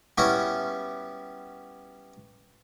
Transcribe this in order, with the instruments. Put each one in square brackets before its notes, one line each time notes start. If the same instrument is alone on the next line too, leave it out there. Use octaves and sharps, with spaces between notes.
[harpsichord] G3 B3 C#4 E4 F#4